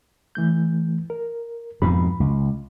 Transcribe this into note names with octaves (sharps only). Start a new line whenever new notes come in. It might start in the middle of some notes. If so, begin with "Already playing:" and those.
E3 A3 G6
A#4
F2 G#2 B2 B5
C#2